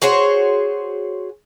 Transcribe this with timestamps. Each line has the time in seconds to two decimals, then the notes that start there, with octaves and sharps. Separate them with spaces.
0.02 F#4 G#4 C5 C#5